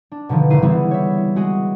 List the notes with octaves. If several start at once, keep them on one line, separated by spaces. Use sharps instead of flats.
D4
B2 D3 D#3 F3
G#1 C#3 E4 C7 D#7
E3 G3 B3 C4 E4 G#4
C#5 E5
G#3 F#4 G#4